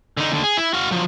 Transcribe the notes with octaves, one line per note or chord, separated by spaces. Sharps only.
D3 D#4
D#2 D3
G#4
E4
F#4 F5
F3 F#3